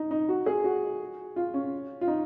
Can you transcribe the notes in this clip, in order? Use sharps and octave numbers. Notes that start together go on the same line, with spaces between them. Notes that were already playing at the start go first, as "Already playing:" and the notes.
Already playing: D#4
D#4
F#4
G#4
F#4
F4
C#4
F4
D#4